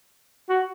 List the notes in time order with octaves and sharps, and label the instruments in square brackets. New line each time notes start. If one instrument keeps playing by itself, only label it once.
[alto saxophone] F#4